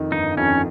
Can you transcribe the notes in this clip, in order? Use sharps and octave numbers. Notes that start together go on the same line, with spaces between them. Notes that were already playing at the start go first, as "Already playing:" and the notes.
Already playing: F2 D#3
G1 D#4
F2 C#4